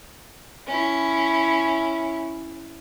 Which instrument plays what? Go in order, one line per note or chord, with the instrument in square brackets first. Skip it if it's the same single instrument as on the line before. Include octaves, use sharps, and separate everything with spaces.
[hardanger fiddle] C#4 E4